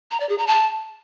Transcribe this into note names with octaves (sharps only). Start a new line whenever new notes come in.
A#5
D5
G#4
A#5
A5